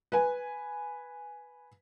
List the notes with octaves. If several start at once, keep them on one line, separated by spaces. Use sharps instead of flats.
B4 G#5